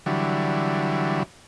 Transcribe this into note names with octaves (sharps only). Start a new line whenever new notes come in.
D3 E3 F#3 G3